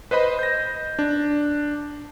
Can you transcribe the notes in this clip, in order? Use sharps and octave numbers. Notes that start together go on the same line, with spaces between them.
B4 C5 D#5 B5
G6 A#6
D4